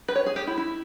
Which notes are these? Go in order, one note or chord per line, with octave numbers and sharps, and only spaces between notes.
B4
C#5
G#4
G4
E4
E4